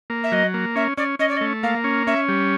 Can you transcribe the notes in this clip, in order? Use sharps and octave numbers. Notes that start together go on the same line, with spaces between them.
A#3
E5
F#3 D#5
A#3
C#4 E5
C#4 D5
C#4 D#5
D5
D#5
A3
A#3 F5
C#4
C#4 E5
G3